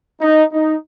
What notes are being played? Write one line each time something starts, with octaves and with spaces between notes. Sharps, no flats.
D#4
D#4